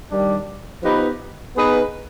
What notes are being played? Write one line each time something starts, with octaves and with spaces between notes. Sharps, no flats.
D#3 G3 D4
F3 B3 D#4 G4 B4
B3 D#4 G#4 B4